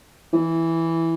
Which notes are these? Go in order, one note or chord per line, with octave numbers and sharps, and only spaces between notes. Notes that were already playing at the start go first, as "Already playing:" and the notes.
E3